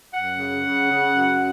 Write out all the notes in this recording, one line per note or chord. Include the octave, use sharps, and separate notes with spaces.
F#2 F#5
C#3
C#3
C#3
F#2